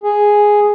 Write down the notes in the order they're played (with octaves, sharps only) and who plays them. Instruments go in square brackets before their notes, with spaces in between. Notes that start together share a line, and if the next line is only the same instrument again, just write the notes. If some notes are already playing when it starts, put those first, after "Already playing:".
[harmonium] G#4